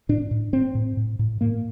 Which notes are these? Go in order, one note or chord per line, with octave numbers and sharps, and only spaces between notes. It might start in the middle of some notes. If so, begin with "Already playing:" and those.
A2 D4
A2
A2 C4
A2
A2
A2
A2 A#3